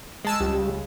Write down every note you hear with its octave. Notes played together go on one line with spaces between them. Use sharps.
G#3 A5 E6
C#2 G3